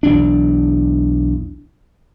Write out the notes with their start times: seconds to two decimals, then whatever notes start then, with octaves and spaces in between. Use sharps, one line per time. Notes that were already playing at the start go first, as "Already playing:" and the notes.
0.03 B1 E2 D4